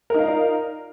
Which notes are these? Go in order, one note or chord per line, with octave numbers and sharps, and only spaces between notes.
D#4 F4 A#4 D5 F5